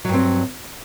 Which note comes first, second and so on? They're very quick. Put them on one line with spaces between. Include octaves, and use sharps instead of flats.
F#3 G2 C4